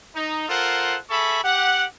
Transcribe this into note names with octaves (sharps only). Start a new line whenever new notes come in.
D#4
F4 A4 A#4 C5 F#5
G#4 A4 E5 B5 C#6
G4 F#5